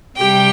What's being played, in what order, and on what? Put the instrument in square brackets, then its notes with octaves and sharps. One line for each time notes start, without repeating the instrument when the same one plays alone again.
[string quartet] C3 G3 G4 G5